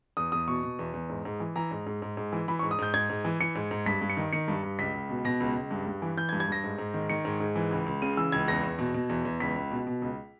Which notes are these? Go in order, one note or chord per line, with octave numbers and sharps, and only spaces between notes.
E2 D#6
E2 D#6
B2 C#6
B2
E2
E2
G#2
G#2
E3
E3 A#5
G#2
G#2
G#2
G#2
E3
E3 B5
C#6
G#2
D#6
G#2 G6
G#2 G#6
G#2
E3
E3 C#7
G#2
G#2
G2 B6
G2
C#7
D#3
D#3 C#7
G2
G2
C#2 B6
C#2
B2
B2 A#6
C#2
C#2
G2
G2
E3
E3 G6
G#6
G2
G#6
G2 A#6
G#2
G#2
D#3
D#3 C#7
G#2
G#2
E3
C#2
C#2
C#3 D#7
E3 E6
C#2 G#6
E2 A#6
E2
B2
B2
E2
E2
C#2 B6
C#2
B2
B2
C#2